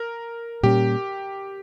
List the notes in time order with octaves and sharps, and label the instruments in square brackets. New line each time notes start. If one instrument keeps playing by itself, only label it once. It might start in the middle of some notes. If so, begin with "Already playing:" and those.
Already playing: [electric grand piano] A#4
[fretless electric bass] A#2 G3 C#4 [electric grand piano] G4